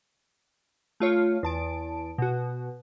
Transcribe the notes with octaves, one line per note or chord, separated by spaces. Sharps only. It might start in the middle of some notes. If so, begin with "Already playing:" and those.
A3 F4 C#5
E2 A5 D7
B2 F#4